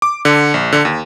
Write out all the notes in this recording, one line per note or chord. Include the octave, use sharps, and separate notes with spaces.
D6
D3
A#1
D3
D#2